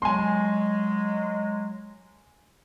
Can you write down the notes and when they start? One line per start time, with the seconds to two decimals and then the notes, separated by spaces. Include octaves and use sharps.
0.02 F#3 G#3 G#5 C6